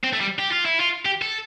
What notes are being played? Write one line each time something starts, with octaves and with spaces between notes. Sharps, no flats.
C4
A3
G3
G4
F4
E4
F4
G4
A4